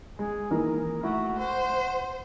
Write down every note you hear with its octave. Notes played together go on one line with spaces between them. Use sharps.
G#3 G#4
D#3 E3 A#3 A#4
A3 E4 F#4
C5 F#5